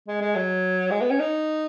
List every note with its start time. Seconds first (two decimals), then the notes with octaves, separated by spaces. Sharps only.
0.08 G#3
0.21 G#3
0.36 F#3
0.91 G#3
1.01 B3
1.10 C#4
1.19 D#4